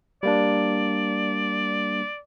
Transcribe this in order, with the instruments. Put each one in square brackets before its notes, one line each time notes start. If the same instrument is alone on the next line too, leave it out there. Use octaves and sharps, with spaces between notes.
[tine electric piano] G3 A#3 D4 [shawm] D5